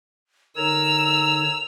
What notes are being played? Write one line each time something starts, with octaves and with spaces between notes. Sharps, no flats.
D3 D#4 A#4 C#5 E6 F7